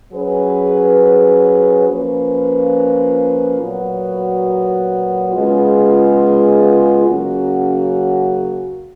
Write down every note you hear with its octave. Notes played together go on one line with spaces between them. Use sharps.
F#3 C#4 G#4 B4
F3 A#3 C#4 F4 B4
A#2 F#3 B3 F#4
C#3 G#3 B3 F4
C#3 F#3 A#3 C#4 F#4